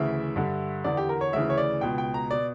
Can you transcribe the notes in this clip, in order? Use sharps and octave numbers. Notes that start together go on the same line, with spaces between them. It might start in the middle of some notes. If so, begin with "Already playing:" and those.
Already playing: D2 C#3 E3 E5
G2 D3
E2 D3 D5
G4
A#4
C#5
D2 C#3 E3 E5
C#5
D5
C#2 B2 G5
G5
A#5
B2 D5